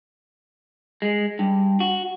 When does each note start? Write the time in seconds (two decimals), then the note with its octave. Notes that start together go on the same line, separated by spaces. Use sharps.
1.02 G#3
1.39 G2
1.80 F#4